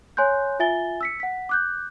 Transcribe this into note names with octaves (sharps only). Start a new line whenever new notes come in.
C#5 G#5 C6 F#6 G6
F4 E5 G#5 A6 G7
E6 B6 C#7
F#5 B6
D6 F#6 G6